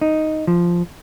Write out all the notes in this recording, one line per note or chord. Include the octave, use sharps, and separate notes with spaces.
D#4
F3